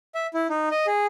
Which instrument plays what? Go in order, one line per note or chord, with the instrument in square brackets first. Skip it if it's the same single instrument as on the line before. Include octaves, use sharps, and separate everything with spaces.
[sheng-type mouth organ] E5
E4
D#4
D#5
G#4